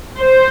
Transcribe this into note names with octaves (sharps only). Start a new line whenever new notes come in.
C5